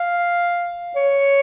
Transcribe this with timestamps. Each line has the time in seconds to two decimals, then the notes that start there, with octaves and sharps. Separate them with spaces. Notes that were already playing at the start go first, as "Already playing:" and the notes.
Already playing: F5
0.96 C#5